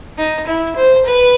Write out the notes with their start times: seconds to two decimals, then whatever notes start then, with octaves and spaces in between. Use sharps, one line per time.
0.18 D#4
0.47 E4
0.76 C5
1.05 B4